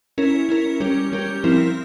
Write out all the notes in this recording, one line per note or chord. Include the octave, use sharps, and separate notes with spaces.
C#4 E4 A#4
C#4 E4 A#4
G3 C#4 G4 A#4
G3 C#4 G4 A#4
F3 C4 E4 A#4